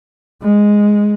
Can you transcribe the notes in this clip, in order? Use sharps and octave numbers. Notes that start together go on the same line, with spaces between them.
G#3